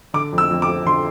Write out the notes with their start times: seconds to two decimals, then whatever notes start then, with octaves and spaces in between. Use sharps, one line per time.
0.14 D3 D6
0.32 F2
0.38 E6
0.51 F2
0.62 D6
0.68 F3
0.86 D3 C6